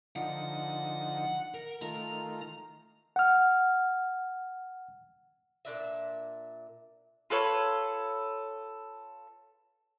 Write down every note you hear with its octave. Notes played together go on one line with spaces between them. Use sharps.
D3 F3 D#4 F#5
A#4
D#3 A3 F4 A#5
F#5 F6
A#2 C#3 D4 E5
F4 A4 B4 C#5